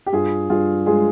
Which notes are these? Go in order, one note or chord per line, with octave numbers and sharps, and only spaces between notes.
G4
G2 F4 G#4
G2 F4 G#4
G#3 F4 G#4